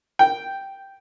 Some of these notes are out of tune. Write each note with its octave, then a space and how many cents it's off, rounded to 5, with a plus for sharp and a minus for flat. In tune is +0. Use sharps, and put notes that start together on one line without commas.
G5 -5